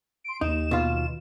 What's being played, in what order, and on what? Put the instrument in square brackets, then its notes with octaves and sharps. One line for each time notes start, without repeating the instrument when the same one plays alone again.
[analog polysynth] C6 D7
[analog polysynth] D#2 E7 [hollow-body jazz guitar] D#4
[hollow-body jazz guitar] B2 F4